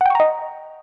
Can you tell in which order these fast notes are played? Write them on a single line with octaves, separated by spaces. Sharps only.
F#5 G5 C#6 A#5 D#5